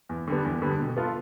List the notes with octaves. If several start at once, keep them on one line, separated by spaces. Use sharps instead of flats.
E2
D3 G3 B3
E2
D3 G3 B3
B2
B3 F4 A4